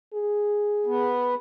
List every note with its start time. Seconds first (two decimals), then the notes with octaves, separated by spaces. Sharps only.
0.14 G#4
0.86 B3